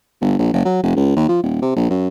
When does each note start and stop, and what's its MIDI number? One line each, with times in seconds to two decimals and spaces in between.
0.21 0.38 31
0.39 0.51 34
0.53 0.63 30
0.65 0.80 54
0.83 0.94 29
0.96 1.14 37
1.16 1.27 39
1.29 1.39 53
1.43 1.58 27
1.62 1.71 48
1.76 1.86 34
1.90 2.08 42